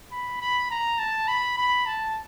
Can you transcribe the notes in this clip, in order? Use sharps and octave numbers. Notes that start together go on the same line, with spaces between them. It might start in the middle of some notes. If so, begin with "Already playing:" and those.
B5
B5
A#5
A5
B5
B5
A5